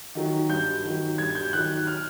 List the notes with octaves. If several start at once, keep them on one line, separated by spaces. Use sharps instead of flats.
D#3 F#3
G2 G6
D#3 F#3
G2 G#6
G6
D#3 F#3 F#6
F6